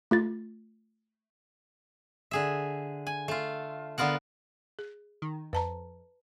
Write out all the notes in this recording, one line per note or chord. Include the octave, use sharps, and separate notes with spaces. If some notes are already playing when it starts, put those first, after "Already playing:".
A3 F4 A6
D3 G#4 E5
G#5
A3 F4
D3 B3 F4 A#4 F#5
G#4
D#3
F2 B4 A5 A#5